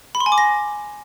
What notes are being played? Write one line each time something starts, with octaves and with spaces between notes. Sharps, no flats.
B5
C6
G#5
D6
A#6